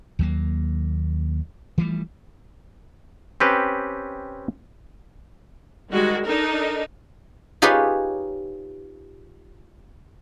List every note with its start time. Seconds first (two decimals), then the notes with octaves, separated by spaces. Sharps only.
0.19 D#2 F#3 A#3
1.78 E3 F3 G3 A3
3.40 C4 C#4 G4 B4
5.91 D#3 G3 G#3 F#4
6.25 D4 D#4 A4 A#4
7.62 D#4 F4 G4 G#4 B4 C#5